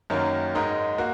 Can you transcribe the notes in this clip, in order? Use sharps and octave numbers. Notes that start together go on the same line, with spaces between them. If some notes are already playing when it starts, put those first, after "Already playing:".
F#2 D#3 A#3 C#4 A#4
G#2 G#3 D#4 A#4
A#3 F#4